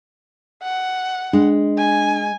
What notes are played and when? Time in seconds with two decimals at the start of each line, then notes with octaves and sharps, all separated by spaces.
0.63 F#5
1.33 G#3 D4
1.77 G#5